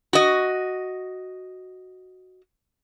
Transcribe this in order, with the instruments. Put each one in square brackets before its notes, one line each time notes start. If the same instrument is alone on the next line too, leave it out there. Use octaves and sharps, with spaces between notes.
[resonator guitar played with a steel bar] F#4 D#5